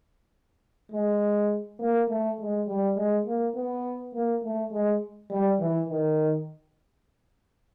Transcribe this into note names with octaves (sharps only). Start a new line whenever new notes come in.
G#3
A#3
A3
G#3
G3
G#3
A#3
B3
A#3
A3
G#3
G3
E3
D#3